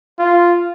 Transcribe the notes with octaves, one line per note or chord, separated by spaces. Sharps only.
F4